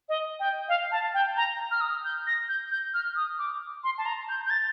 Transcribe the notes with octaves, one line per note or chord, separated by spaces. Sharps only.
D#5
G5
F5
A5
G5
A#5
F6
D#6
G6
A#6
G6
G6
F6
D#6
D6
C6
A5
A#5
G6
G6
A6